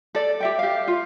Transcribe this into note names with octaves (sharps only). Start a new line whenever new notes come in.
A4 D5
G4 E5 G5
G4 F5
F4